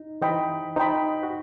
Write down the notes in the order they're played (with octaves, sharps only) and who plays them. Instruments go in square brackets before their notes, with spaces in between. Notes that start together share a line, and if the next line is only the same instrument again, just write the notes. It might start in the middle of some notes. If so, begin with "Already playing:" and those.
Already playing: [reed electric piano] D#4
[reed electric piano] E3 [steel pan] C5 D#5 G5 B5
[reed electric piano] D#4 [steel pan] C5 D#5 G5 B5
[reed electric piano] F#4